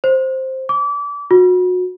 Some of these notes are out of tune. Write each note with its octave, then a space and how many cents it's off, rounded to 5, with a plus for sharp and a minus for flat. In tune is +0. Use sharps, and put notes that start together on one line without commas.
C5 +5
D6 -30
F#4 -30